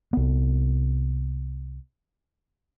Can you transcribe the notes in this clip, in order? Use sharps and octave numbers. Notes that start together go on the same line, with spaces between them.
C2 B3